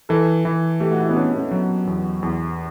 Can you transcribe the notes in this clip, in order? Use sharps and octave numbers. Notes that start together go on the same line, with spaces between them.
E3 A4
E3
A3 G4
F#4
E4
B3
C#4 D4
B3
F#3
E2
E2